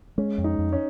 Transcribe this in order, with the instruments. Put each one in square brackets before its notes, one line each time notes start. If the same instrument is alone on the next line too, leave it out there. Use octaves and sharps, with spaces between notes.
[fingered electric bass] G#3 [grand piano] C#4
[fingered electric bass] F2
[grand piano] D#4
[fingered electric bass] F2
[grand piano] C#4